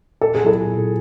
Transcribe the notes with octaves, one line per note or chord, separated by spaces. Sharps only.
A#2 A4
G#4
F#3 B3 E4 G4 A4
A#2